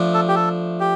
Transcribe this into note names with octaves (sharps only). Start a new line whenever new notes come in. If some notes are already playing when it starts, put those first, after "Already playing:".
Already playing: F3 A3 D4
A4
G4
A4
G4